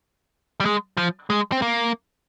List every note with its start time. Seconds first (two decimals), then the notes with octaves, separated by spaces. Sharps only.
0.60 G3
0.65 G#3
0.97 F3
1.30 G#3
1.52 C4
1.62 A#3